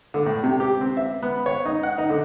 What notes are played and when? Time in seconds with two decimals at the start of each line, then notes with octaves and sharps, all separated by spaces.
0.14 D3
0.26 A2
0.44 C3
0.60 G4
0.81 C4
0.97 E5
1.23 B3
1.46 C#5
1.65 D#4
1.83 F#5
1.98 D#4
2.10 D3